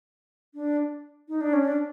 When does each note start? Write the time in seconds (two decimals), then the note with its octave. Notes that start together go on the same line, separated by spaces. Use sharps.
0.55 D4
1.28 D#4
1.41 D4
1.53 C#4
1.65 D4